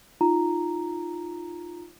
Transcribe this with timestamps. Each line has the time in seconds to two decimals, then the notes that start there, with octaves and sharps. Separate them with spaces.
0.21 D#4 F4 A#5